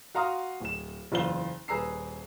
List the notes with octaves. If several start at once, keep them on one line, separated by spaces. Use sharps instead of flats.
F#4 F5 A#5 C6 D#6 F6
D1 E7
F#1 E2 F4 C5 F5 G7
D#1 G#4 B4 A#5 E6 C7